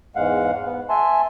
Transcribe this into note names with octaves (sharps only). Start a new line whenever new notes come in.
E2 G#2 G#3 F5 F#5
B3
E5 G#5 A5 C6